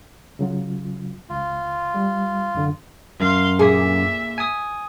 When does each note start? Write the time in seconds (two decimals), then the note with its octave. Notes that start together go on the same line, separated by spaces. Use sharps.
0.39 C#3 F#3 F4
1.30 C#2 F4
1.94 G3
2.54 F#2 D3
3.20 F#2 F5 C6
3.59 A#2 G#4 E5
4.38 G#5 D#6